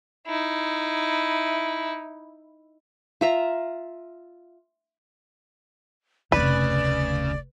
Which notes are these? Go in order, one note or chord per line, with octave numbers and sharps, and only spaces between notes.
D#4 E4
F4 E5 A#5
F1 D2 C#3 B4 D5